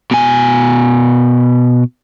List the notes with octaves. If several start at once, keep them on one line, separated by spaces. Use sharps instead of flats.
B2 G#5